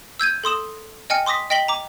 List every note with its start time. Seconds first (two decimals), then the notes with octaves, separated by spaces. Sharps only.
0.20 E6 G6 G#6 D#7
0.44 A4 C6 D#6 E7
1.10 D#5 G5 G#5 F6 C#7
1.26 C6 D6 D#6 A#6 B6
1.50 D#5 G5 A#6 B6 F#7 G7
1.68 A#5 D6